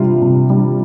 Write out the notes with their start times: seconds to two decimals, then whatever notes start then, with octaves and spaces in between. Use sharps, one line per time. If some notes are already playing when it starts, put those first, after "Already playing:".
Already playing: C3 G3 F4
0.22 C3
0.50 G3